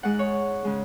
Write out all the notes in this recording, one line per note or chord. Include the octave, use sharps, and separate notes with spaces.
G#2 G#3 F#5
C#5
C#3 G#3